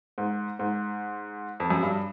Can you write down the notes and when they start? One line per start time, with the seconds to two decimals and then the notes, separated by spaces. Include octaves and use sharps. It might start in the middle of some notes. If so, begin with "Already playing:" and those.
0.18 G#2
0.59 G#2
1.60 F2
1.70 F#2
1.83 G2